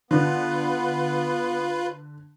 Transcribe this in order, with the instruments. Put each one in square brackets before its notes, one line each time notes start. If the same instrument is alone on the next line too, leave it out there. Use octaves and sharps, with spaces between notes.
[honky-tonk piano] D3 [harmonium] B3 [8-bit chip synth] F4 B4